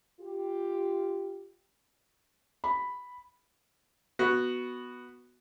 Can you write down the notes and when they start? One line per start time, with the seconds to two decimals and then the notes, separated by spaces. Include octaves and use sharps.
0.20 F4 G4
2.64 B5
4.19 B3 F#4